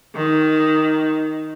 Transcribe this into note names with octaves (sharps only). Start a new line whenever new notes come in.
D#3